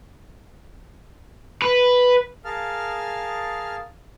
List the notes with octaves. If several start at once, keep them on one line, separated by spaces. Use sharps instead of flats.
B4
G#4 A#4 F5 A5 F6